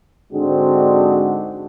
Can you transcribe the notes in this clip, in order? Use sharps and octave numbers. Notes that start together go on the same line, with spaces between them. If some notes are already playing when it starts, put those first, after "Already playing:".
G#2 D3 G#3 C4 D4 F#4